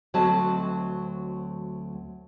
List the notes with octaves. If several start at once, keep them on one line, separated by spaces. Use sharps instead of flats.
D2 F#3 C4 D#5 A5